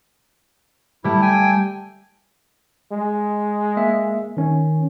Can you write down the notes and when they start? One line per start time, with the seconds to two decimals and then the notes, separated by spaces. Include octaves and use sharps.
1.04 G3 A3 E4
1.22 G5 G#5
2.92 G#3
3.77 A#3 E5
4.37 D#3 C#4